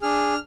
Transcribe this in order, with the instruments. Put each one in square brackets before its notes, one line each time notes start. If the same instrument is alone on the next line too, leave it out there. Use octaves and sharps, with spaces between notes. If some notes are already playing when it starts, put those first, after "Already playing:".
[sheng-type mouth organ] D4 G#4 F6